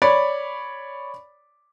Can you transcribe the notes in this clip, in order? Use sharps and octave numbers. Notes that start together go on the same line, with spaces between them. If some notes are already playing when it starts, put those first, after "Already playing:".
C#5 D5 B5